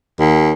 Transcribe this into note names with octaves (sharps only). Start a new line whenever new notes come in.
D#2